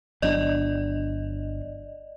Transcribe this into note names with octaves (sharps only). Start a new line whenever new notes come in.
G1 F#3 D4 D5 D#5